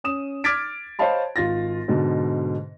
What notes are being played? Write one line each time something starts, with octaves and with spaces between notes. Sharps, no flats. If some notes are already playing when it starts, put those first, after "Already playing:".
C#4 D#6 E7
D6 F6 G#6 A6 B6 D7
C5 C#5 D#5 F5 A5 B5
G#1 F4 A6 A#6
G#2 B2 D3